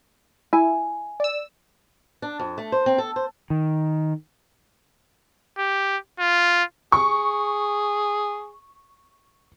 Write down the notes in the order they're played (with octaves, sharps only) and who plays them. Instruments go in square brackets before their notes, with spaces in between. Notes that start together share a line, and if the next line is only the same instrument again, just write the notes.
[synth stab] E4 [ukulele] G#5
[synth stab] D5 E6
[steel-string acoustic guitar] D4
F2
A3
C5
C4
A4
C5
[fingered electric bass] D#3
[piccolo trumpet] G4
F4
[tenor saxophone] G#4 [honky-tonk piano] C#6